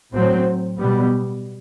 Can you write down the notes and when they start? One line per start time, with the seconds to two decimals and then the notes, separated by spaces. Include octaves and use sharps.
0.14 A2 F#3 C4
0.79 B2 G3 B3